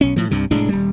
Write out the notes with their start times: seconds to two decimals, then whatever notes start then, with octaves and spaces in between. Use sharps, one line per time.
0.01 B1 C#4
0.16 A2 F3
0.31 C2 G2 C3
0.51 F1 A2 G#3 D4
0.69 D#1 G3